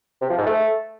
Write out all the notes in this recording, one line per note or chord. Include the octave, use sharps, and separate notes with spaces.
C3
F3
G#2
A3